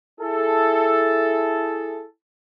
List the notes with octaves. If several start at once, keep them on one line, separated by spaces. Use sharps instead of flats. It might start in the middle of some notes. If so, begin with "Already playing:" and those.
E4 G#4 A4